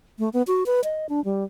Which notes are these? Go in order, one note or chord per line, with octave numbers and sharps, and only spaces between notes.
A3
B3
F#4
B4
D#5
D4
G3